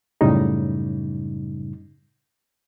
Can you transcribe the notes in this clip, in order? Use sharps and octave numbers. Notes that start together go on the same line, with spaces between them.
F#2 A2 C#3 G3 D#4